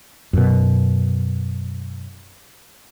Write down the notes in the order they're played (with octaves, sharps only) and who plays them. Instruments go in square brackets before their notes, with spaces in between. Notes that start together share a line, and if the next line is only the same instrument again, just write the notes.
[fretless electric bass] F#2 B2